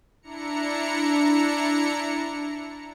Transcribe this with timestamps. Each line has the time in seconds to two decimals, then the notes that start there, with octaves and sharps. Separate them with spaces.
0.22 D4 E4 A#5 C#7